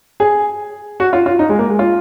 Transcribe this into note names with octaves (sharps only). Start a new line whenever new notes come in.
G#4
F#4
F4
F4
D#4
G#3
A#3
G#3
F4